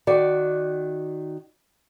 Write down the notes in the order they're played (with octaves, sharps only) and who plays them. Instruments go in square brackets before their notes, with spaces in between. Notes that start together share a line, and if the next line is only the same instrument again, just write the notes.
[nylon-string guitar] D#3 F#4 D5